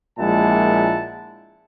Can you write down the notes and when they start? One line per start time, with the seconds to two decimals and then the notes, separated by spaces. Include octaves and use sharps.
0.19 A#1 A#2 G#3 E4 F#5 A5